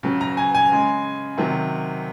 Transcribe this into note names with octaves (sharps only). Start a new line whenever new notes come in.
C#3 F#3
A#5
G#5
G#5
C#3 G#3
C3 D#3 F#3